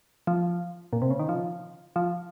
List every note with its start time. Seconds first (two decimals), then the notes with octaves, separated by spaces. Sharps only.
0.27 F3
0.93 A#2
1.02 C3
1.10 C#3
1.20 D#3
1.29 F3
1.96 F3